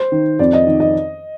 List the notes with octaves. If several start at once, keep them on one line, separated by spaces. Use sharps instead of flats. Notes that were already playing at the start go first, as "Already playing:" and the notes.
Already playing: C5
D#3
F2 D5
D#5
D#3
D#5